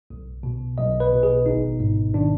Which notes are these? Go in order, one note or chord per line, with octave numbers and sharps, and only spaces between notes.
B1
B2
B1 D#5
B4
B2
G#4
G#1 D#4
G#2
D#3 D4